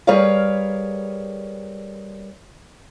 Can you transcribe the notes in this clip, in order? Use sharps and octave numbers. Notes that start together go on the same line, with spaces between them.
G3 G#4 A#4 B4 C#5 F5